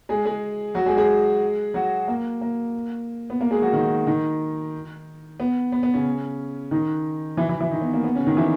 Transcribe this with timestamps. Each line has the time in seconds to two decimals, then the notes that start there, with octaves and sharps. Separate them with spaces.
0.09 G#3 G#4
0.25 G#3 G#4
0.75 F#3 F#4
0.86 G#3 G#4
0.97 G#3 G#4
1.74 F#3 F#4
2.08 A#3
2.41 A#3
3.30 B3
3.41 A#3
3.51 G#3 G#4
3.62 F#3 F#4
3.73 D#3 D#4
4.07 D#3 D#4
5.40 B3
5.72 B3
5.83 B3
5.94 C#3 C#4
6.71 D#3 D#4
7.37 E3 E4
7.49 E3 E4
7.60 E3 E4
7.71 D#3 D#4
7.82 B3
7.94 A#3
8.04 B3
8.15 C#3 C#4
8.26 D#3 D#4
8.37 E3 E4